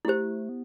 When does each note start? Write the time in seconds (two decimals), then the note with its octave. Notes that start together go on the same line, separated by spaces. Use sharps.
0.05 A3 E4 G4 C5
0.49 B3